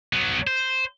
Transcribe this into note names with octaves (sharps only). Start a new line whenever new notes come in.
F#3 B3
C5